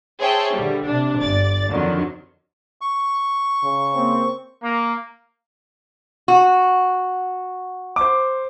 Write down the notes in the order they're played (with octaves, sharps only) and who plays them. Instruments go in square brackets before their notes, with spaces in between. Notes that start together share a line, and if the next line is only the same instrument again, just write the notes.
[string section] G#4 C5 C#5 E5 G5 A5
D3 G3
C3 D4
G1 D5 A6
F2 D3 D#3 F#3
[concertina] C#6
[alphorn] C#3
[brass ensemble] A#3 C4
[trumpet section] A#3
[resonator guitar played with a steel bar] F#4
[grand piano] C5 D6